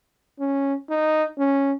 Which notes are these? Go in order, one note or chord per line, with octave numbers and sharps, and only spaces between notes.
C#4
D#4
C#4